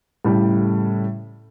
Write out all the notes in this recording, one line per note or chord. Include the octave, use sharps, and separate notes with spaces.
A2 C#3 G3